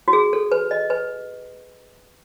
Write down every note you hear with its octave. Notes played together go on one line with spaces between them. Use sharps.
F#4
G#4
A4
B4
D#5
B4